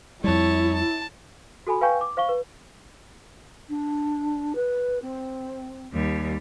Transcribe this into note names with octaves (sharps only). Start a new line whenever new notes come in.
F2 G3 E4 C#5 A5
A5
F#4 A4 G#5 B5
B4 F5 G5 G#5 C#6 G6
D6
C5 F5 C#6 G7
B4
D4
B4
C4
D#2 G3